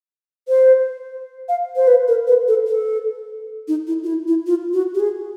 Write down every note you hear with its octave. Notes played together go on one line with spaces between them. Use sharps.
C5
F5
C5
B4
A#4
B4
A4
A4
D#4
E4
F4
E4
E4
F4
F#4
G4
G#4